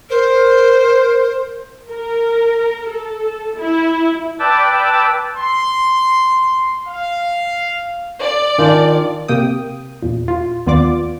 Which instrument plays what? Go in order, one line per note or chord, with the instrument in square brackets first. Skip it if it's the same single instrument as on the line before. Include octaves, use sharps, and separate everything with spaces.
[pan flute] A#4 [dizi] C5
[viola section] A#4
A4
E4
[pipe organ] B4 D5 G5 A5 D6 E6
[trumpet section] C6
F5
[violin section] D5
[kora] D#3 [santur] D4 F4 G#5
[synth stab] C3 A#3 G5 D#6
E2 A#2
F4
D#2 B3 F4 D5 D6